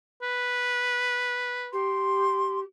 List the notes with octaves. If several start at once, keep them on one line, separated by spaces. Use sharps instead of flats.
B4
G4 C6